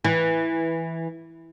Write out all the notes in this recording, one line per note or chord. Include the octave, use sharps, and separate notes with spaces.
E3